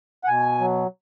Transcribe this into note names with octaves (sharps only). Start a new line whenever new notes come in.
F#5
B2 G#5
F#3